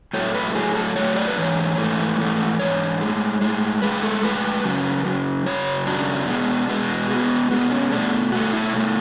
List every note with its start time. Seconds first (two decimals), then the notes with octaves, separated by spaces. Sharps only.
0.13 A2 F#3 A3 C#5
0.35 B4
0.55 A2 F#3 A3 G#4
0.75 A4
0.96 A2 F#3 A3 C#5
1.17 D5
1.28 B4
1.37 G#2 E3 C#5
1.78 G#2 E3 A3
2.18 G#2 E3 A3
2.59 G#2 E3 C#5
3.01 A2 G#3
3.41 A2 G#3
3.82 A2 G#3 B4
4.02 A4
4.23 A2 G#3 B4
4.64 F#2 C#3 F#3
5.05 F#2 C#3 F#3
5.46 F#2 C#3 F#3 C#5
5.87 F#2 C#3 F#3 D4
6.27 B2 G#3
6.69 B2 G#3 B3
7.10 B2 G#3
7.51 B2 G#3 B3
7.71 C#4
7.92 B2 A3 D4
8.32 B2 A3 F#4
8.53 E4
8.74 B2 A3